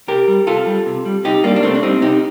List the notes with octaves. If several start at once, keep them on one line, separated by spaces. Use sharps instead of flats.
C3 G4 A#4
G3
C3 F4 A4
G3
C3
G3
C3 D#4 G4
G3 A#3 D4
D4
C3 A3 C4
D4
G3 C4 D#4
C3 D#4 G4